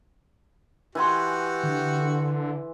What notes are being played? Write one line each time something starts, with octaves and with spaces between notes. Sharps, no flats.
E3 F#4 G4 G#5 C6
D3